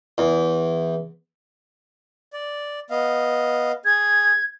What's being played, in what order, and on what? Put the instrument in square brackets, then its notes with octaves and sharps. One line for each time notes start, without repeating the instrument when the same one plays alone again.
[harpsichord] E2
[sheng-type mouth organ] D5
B3 D#5 F5
[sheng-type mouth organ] G#4 [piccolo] G#6